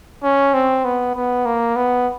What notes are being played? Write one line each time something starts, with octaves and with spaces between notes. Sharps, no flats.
C#4
C4
B3
B3
A#3
B3